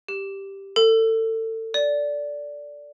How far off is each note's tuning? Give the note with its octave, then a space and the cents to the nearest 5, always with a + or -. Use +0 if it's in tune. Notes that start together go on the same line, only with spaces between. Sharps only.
G4 +0
A4 +30
D5 -10